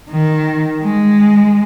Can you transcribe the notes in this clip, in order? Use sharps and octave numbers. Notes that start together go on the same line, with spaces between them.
D#3
G#3